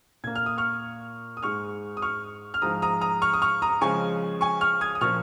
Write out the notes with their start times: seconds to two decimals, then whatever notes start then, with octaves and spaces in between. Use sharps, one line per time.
0.24 A#2 A#3 G#6
0.35 F6
0.46 D#6
0.58 C#6 F6
1.37 D#6
1.43 G#2 G#3 C#6 F6
1.97 D#6
2.02 C#6 F6
2.54 F6
2.62 G#2 F3 G#3 A#5 D#6
2.82 A#5 D#6
3.01 A#5 D#6
3.22 C#6 F6
3.33 D#6
3.42 C#6 F6
3.62 A#5 D#6
3.81 C#3 F3 G#3 G#5 C#6
4.41 G#5 C#6
4.61 C#6 F6
4.81 D#6 G#6
4.95 D#6
5.01 A#2 F3 A#3 C#6 F6